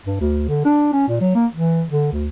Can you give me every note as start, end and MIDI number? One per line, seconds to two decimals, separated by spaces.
0.06 0.18 43
0.20 0.47 38
0.48 0.61 50
0.65 0.88 62
0.93 1.07 61
1.08 1.20 46
1.21 1.34 54
1.35 1.47 58
1.53 1.84 52
1.90 2.10 50
2.12 2.29 38